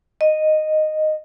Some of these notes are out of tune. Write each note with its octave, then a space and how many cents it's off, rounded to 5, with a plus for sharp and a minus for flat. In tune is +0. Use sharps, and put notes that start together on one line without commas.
D#5 -10